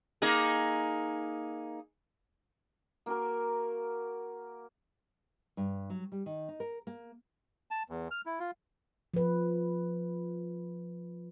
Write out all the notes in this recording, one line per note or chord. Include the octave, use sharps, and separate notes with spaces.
A#3 D#4 G#4
A#3 F#4 A#4
G2
F#3
G3
D#3
D#4
A#4
A#3
A5
E2
F6
E4
F4
F3 B4